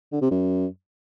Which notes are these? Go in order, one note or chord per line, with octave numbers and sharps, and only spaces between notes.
D3
C3
F#2